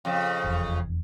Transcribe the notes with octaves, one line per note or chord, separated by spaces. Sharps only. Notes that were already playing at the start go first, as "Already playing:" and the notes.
F2 C#3
F1 E2